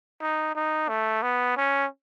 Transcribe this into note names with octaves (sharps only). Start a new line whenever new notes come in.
D#4
D#4
A3
B3
C#4